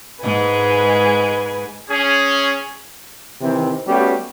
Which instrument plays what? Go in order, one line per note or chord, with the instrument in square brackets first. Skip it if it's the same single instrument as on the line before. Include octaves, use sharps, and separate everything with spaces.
[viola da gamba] G#2 G#3 [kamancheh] B4 G#5
[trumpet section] C#4 G#4
[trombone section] C3 D#3 E3 C4
G3 A3 B3 C#4 F#4 G4